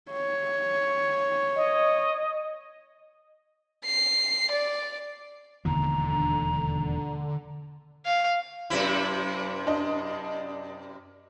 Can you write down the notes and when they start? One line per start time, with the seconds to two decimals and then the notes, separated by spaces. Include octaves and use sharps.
0.11 C#5
1.56 D#5
3.85 C7
4.52 D5
5.65 E1 D#2 D3 F3 A#5
8.05 F5
8.70 F#2 C3 E4
9.67 D4 D#5